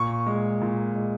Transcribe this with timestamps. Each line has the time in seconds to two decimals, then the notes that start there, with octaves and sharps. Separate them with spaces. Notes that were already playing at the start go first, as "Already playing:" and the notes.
Already playing: A#2 C#6
0.27 G#3
0.61 A#2
0.96 G#3